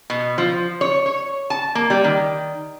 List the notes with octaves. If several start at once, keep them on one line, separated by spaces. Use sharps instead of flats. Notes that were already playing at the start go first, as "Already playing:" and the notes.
B2
F3
C#5
C#5
A5
A#3
G3
D#3